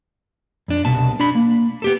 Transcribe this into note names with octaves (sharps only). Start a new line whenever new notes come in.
F2 D4
C2 B2 A5
D4 B5
A#3
B3 G4 A4